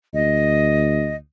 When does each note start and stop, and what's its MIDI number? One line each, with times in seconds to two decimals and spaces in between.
0.14 1.17 38
0.14 1.16 75